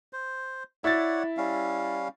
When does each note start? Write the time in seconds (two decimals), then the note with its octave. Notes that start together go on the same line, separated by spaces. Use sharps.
0.13 C5
0.84 E4 C#5 D5 F#5 A6
1.37 G3 C#4 F5